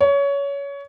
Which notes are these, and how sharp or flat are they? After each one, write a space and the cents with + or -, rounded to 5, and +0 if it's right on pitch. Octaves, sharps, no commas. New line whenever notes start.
C#5 +20